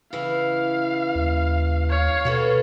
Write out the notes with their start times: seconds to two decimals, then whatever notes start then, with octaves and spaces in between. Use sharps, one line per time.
0.13 C#3 E3 E4 F5
1.15 D#2
1.90 C#5 F5
2.25 B2 F#4 A4 B4